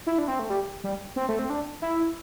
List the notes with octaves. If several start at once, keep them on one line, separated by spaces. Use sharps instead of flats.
E4
D4
C4
A3
G3
G3
C4
A3
C4
D4
E4